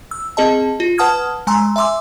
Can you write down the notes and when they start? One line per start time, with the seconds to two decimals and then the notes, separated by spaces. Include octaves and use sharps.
0.11 E6
0.37 C4 G#4 D#5 A5
0.80 F4
0.98 B4 F#5 A5 D#6 F6 G#6
1.47 G#3 G#5 A#5 C6 E6
1.76 E5 G#5 C6 D6 E6